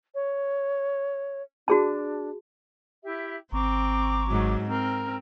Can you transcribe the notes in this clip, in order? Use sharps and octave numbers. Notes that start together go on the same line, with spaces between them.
C#5
D4 F#4 G#4 A5
E4 G4 E5
G#1 C4 A#5 C#6 D6
G#2 F#3
C4 A#4 A#5 F6